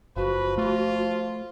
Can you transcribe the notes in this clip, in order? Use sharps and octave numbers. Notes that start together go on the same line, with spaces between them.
F#1 F3 F#4 B4
A3 F4